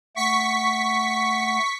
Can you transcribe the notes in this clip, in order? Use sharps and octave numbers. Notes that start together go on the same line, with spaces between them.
A3 F#5 C#6 B6